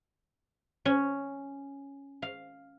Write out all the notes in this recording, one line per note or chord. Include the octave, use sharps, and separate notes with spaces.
C#4
F5